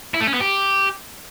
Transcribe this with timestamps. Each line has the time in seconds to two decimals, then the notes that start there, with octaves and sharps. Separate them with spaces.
0.14 E4
0.21 A3
0.27 C#4
0.34 B3
0.40 G4